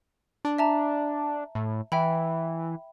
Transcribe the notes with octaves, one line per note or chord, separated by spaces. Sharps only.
D4
E5 A5 A#5
A2
E3 E5 G5 B5